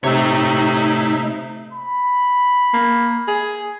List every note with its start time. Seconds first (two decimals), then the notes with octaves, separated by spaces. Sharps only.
0.04 C3 A3 D#4 C#5 E5 E6
1.73 B5
2.73 A#3
3.28 G#4